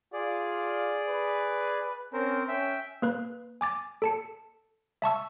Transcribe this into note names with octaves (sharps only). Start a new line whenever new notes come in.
F4 G#4 D5
B4
C4 C#4 A#4 C5
C#4 E5 G5
A#3 B4 F#6
G#5 D6 A6
A4 A5 C#7
E5 A5 C#6 E6